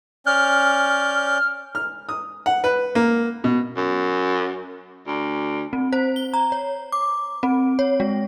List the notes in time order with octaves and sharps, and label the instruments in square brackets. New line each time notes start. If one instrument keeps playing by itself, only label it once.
[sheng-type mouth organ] C#4 D5 G6 [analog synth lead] F6
[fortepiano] F6
D#6
F#5
B4
A#3
B2
[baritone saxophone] F#2
D2
[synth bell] C4
C5
G7
A#5
C#5
D6
C4
C#5
G#3